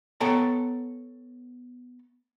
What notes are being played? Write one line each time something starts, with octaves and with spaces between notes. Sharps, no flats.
B3 A4 C#5 G5 A5 A#5